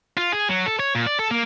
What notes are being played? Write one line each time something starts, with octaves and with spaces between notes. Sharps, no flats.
F4
G#4
F#3
A4
C#5
A#2
D5
A4
A#3